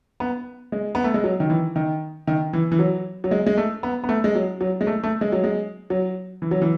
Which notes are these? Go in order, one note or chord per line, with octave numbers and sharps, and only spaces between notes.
B3
G#3
B3
A3
G#3
F#3
D#3
E3
D#3
D#3
E3
E3
F#3
F#3
G#3
G#3
A3
B3
B3
A3
G#3
F#3
F#3
G#3
A3
A3
G#3
F#3
G#3
F#3
E3
F#3
E3